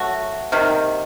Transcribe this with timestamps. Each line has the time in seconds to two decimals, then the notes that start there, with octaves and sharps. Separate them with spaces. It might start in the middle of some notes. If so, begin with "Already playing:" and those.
Already playing: F#3 A3 F#4
0.52 C3 D#3 A#3